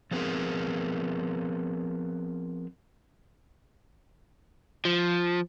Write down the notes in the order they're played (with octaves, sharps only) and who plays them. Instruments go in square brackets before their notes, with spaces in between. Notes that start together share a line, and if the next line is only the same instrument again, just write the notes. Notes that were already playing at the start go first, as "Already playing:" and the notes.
[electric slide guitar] F3 F#3 B3 C4 G#4 A#4
[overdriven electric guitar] F3